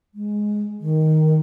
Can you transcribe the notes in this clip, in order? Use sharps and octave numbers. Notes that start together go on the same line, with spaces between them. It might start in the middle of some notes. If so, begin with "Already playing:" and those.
G#3
D#3